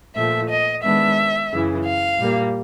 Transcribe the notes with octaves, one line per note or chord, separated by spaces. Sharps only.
A#2 F3 A3 E5
D#5
D#3 G#3 B3 D4 E5
F#2 C#3 E3
F5
A#2 G3 A#3